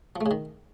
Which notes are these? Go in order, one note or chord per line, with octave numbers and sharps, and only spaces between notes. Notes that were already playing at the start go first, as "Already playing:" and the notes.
F3
A3
C#3
D#3